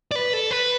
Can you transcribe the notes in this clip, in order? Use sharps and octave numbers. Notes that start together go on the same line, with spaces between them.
D5
B4
A4
B4